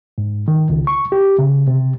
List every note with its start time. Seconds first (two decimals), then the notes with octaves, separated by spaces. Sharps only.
0.18 G#2
0.48 D#3
0.70 C#2
0.87 C#6
1.12 G4
1.39 C#3
1.67 C3